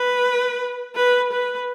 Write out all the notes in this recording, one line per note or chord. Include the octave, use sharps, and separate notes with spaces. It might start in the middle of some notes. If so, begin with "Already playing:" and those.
Already playing: B4
B4
B4